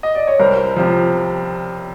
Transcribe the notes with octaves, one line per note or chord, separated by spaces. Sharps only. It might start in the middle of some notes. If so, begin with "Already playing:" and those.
D#5
D5
C#5
C2 A#4 C5
C3 F3